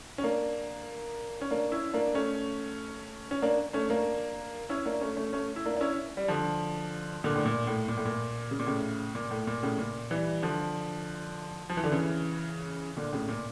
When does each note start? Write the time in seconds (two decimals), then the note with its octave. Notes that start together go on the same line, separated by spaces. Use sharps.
0.18 C#4
0.23 A#3 D4
1.41 C#4
1.51 A#3 D4
1.72 C#4 E4
1.94 A#3 D4
2.14 A3 C#4
3.31 C#4
3.42 A#3 D4
3.73 A3 C#4
3.90 A#3 D4
4.69 C#4 E4
4.86 A#3 D4
5.01 A3 C#4
5.17 A3 C#4
5.33 A3 C#4
5.56 E4
5.66 A#3 D4
5.76 D4
5.81 C#4 E4
6.17 G3
6.28 D3 F3
7.24 A#2 D3
7.35 A2
7.45 A#2
7.67 A2
7.88 A#2
7.97 A2
8.05 A#2
8.51 C#3
8.59 A#2
8.67 A2 C#3
9.15 A#2
9.31 A2
9.47 A#2
9.63 A2 C#3
9.78 A#2
10.11 E3 G3
10.43 D3 F3
11.69 F3
11.77 E3
11.84 D3
11.92 C#3 E3
12.97 A#2 D3
13.13 A2 C#3
13.28 A#2